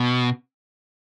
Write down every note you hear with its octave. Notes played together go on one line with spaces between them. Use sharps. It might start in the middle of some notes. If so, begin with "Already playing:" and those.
Already playing: B2